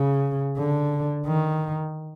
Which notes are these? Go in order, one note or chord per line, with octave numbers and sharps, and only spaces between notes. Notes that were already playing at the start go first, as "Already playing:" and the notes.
Already playing: C#3
D3
D#3